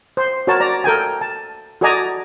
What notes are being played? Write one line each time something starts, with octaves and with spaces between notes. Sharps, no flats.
C5
F#4 A#4 C#5 A5
D5 A#5
A4 A#4 G5 G#5
A5
F#4 A4 D5 D#5 G#5 A#5